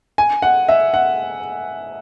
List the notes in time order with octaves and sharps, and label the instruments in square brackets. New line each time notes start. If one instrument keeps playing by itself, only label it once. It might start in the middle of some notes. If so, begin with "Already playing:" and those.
[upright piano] G#5
F#5
E5
F#5